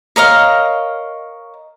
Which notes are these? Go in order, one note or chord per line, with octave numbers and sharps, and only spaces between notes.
A#4 C#5 D#5 F5